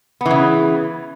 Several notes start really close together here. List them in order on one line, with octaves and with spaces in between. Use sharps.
B3 E3 C#3